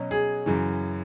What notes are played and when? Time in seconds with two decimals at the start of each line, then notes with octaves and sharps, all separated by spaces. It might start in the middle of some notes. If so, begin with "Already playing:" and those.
Already playing: B2 F#3 C#4
0.11 G#4
0.46 F#2 C#3 E3